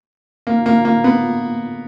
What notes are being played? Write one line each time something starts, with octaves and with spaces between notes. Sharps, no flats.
A#3
A#3
A#3
B3